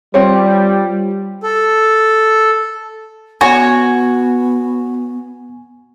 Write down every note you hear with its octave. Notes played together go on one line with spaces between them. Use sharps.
G3 C4 F4 C#5
A4
B3 F#4 C#5 G#5